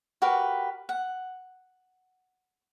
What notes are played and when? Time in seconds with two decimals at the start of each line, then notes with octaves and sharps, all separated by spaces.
0.22 F#4 G4 A#4 B4
0.89 F#5